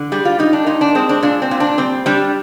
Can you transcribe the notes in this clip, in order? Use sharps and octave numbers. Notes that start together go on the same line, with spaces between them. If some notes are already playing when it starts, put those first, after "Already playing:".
Already playing: D3
G3 G#4
F4
G3 D#4
D4
A#2 D#4
D4
G#3 C4
D4
A#2 D4
C4
A#2
D4
G3 C4
G3 D4